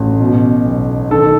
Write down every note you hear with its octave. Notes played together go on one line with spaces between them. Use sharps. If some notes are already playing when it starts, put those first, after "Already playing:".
Already playing: A1
B2
B1
D#3 A4